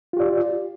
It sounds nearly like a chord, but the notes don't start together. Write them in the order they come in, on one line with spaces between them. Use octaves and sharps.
F4 G4 D5